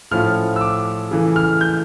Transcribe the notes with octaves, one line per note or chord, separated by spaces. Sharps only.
A2 F3 C#4 F4 F6
E6
D6
C#3 E3 A3
F6
G6